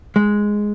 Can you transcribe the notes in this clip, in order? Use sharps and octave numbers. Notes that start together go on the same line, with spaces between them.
G#3